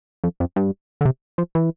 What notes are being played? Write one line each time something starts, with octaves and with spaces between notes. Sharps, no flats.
F2
F2
G2
D3
C3
F3
E3